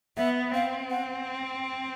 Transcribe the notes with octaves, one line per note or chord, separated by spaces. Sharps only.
B3 E5
C4 F5
F#5